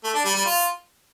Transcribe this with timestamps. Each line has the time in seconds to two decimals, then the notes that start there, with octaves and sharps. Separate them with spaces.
0.04 A3
0.14 D4
0.25 G3
0.35 G3
0.45 F4